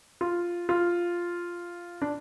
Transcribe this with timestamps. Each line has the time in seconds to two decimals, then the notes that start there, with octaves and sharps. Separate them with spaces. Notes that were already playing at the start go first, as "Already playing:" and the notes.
0.21 F4
0.69 F4
2.02 D4